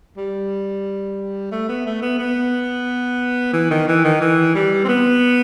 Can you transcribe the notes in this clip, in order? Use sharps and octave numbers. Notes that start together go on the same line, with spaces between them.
G3
A3
B3
A3
B3
B3
E3
D#3
E3
D#3
E3
G3
C4
B3